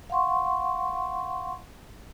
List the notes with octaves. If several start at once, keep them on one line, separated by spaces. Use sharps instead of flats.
F5 F#5 C6 C#6